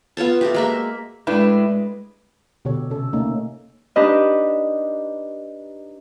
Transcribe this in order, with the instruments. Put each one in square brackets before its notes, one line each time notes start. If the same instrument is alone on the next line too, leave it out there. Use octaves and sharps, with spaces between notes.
[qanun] B3 F4 C#5 A5
A3 F#4 G4
G#3 A#3 E5
[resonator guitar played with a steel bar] A2 D4 E4 [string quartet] G#3 [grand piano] B4
[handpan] B2 D3 G4 A4 C#5
C3 C#4 A4
A3 A#3 C#4 D#4
[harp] D4 D#4 G4 B4 D#5